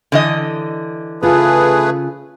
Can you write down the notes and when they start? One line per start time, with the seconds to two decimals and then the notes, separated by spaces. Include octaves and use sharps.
0.12 D3 E3 D#5
1.23 C#3 A3 F4 G#4 B4